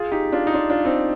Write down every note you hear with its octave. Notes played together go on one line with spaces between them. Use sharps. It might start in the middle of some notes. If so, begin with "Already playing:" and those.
Already playing: F4 G#4
D#4 G4
D4 F4
D#4
D4 F4
D4 F4
C4 D#4